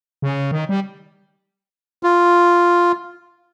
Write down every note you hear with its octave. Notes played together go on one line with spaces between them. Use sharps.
C#3
D#3
G3
F4